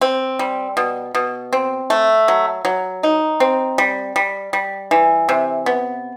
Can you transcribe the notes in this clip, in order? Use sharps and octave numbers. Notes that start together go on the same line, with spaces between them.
C4
G3
B2
B2
C4
A3
F#3
F#3
D#4
C4
G3
G3
G3
E3
C3
B3